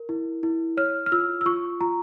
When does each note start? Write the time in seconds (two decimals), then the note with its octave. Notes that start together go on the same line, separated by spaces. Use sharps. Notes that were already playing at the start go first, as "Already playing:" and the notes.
Already playing: A#4
0.09 E4
0.43 E4
0.77 C#5 F6
1.06 F6
1.12 F4 E6
1.41 E6
1.46 F4 C#6
1.81 F4 A#5